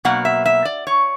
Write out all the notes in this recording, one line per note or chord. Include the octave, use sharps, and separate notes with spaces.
B2 F#3 A#3 F#5
E5
E5
D5
C#5